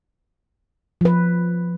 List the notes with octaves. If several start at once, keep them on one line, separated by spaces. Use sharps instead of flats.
F3 B4